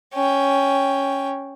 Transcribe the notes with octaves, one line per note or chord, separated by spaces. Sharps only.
C#4 G5